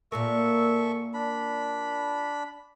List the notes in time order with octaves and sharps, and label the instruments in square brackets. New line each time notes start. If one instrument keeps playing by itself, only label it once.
[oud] A#2 A#3 A#4 [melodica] A4 E5 C#6
[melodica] D4 B5